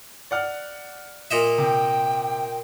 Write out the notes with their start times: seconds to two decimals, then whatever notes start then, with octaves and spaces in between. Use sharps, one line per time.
0.31 D5 F#5 F6
1.31 A#2 D#5 E5
1.58 C3 G5